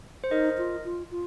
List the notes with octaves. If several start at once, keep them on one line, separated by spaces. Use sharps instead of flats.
C5
D#4 A#4 D#5
F4
F4
F4